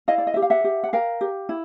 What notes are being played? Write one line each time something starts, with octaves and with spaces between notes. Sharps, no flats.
E4 D#5 F5
D5
D#5
G4 E5
F5
E5 F#5
G4
F#5
A#4 F5 G5
G4
E4